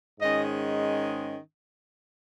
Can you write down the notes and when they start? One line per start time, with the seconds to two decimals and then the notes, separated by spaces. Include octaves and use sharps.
0.20 G#2 D#3 G#3 C#4 D#5